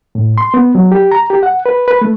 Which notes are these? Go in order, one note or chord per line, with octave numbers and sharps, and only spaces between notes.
A2
C6
B3
F#3
G4
A#5
G4
F#5
B4
B4
A3